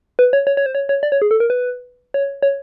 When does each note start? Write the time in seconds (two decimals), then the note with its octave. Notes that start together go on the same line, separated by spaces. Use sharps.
0.19 B4
0.33 C#5
0.47 C#5
0.57 C#5
0.66 C5
0.75 C#5
0.89 C#5
1.03 D5
1.12 C#5
1.22 G#4
1.31 A4
1.40 A#4
1.50 B4
2.14 C#5
2.42 C#5